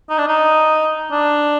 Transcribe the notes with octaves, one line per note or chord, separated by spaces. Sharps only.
D#4
D4
D#4
D4